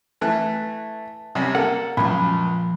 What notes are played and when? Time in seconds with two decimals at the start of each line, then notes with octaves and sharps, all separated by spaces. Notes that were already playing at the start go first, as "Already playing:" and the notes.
0.21 E3 A3 A5 F#6
1.35 C3 G3 C#4
1.55 A#3 A4 F#5
1.97 C#2 F#2 A#2 F3 B5